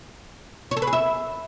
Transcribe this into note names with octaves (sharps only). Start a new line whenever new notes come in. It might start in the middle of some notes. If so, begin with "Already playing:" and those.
C#5
A4
B4
G#4
E5